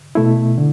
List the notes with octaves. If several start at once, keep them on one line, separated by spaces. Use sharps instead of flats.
B2 A3 E4
D3